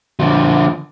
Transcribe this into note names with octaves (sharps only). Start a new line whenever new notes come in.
D3 F3